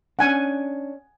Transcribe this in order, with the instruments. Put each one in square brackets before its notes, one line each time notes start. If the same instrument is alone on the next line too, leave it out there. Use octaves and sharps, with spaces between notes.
[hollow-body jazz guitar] C#4 D4 [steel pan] F#5 G#5